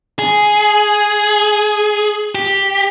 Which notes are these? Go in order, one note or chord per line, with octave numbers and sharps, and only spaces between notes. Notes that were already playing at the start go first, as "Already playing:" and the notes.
G#4
G4